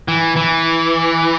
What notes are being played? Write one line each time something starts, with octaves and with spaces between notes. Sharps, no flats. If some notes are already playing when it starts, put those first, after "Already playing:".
E3
E3